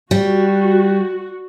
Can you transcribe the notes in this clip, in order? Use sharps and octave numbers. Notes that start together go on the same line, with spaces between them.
G3 F#4